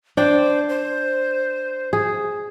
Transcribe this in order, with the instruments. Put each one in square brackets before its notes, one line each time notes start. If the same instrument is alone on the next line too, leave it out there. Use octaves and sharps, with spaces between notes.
[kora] D4 G5 [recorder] C5
[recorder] C5
[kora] G#4